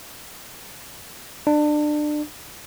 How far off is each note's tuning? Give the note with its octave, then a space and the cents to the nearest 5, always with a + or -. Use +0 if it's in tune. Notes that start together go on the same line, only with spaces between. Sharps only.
D4 +25